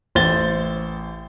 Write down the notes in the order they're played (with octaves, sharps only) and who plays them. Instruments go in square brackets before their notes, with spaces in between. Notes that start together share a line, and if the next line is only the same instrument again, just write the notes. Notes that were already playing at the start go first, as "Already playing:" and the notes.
[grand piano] A1 C5 A6 G7